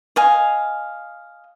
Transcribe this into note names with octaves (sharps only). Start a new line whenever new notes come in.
D#5 F5 G#5